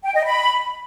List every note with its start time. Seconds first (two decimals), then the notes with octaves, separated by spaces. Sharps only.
0.04 G5
0.14 D#5
0.25 B5